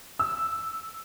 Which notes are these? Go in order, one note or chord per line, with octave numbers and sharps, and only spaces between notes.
E6